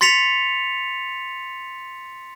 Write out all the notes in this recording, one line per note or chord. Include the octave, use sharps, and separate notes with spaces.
C6 A6 B6 C#7 F7